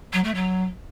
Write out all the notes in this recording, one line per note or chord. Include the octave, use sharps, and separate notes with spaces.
F#3
A3
F#3